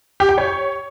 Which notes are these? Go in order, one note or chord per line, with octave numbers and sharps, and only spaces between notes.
G4
G5
C#5